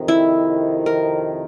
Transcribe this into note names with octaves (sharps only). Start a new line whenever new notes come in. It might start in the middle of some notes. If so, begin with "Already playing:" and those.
Already playing: F2 C3 D#3
E4
A#4